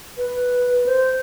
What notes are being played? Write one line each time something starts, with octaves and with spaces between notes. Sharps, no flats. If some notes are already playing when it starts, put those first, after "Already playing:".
B4
C5